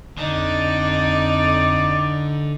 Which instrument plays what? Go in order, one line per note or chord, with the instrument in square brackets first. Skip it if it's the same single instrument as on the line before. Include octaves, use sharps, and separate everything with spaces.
[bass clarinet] F2 [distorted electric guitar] D3 [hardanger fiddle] D#4 [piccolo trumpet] D5